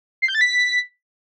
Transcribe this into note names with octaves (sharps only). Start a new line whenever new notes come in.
C7
G6
A6
B6